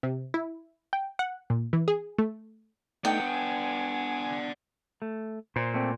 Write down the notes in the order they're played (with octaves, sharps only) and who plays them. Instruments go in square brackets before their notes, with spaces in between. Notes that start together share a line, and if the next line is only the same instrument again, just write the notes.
[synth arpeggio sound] C3
E4
G5
F#5
A#2
E3
G#4
A3
[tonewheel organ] A3 D#4 [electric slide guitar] B3 D4 [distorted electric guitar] D5 F#5 [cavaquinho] G5
[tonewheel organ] G#5
[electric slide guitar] A3
[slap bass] A#2 [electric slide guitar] C5
[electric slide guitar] A3 C4 D5